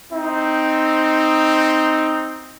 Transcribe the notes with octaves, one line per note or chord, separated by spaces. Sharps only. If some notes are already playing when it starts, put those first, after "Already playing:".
C4 D#4